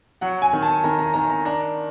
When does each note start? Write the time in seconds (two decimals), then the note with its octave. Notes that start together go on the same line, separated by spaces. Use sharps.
0.21 F#3 F#5
0.42 G#5
0.53 D#3
0.63 A5
0.84 D#3 A#5
0.99 A#5
1.14 D#3 A#5
1.30 A#5
1.45 D4 A#5